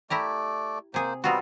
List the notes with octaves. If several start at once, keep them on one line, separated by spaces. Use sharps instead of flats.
A3 E4 G4 A#4 D5
C3 A#3 G#4 C5
G3 B3 C4 D#4 F4 F#4